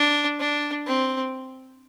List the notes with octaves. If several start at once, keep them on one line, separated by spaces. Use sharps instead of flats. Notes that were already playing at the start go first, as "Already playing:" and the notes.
Already playing: D4
D4
C4